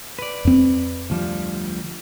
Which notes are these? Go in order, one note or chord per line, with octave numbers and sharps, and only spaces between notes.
B4 D5
F2 C4
D2 F3 G3